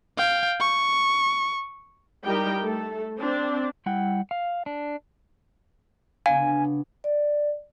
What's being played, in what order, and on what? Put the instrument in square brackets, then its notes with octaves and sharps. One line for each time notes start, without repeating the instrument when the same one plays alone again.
[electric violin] F5 G5
C#6
[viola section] G3 D#4 E4 G4 A#4 G5
A3 A4
C4 D4
[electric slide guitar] G3 E4 F#5 G5
F5
D4
[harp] C#3 B3 D4 [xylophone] F5 [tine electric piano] G#5
[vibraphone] D5